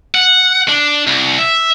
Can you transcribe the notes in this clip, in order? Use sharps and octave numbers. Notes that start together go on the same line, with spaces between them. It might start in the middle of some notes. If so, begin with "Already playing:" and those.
F#5
D4
C2
E5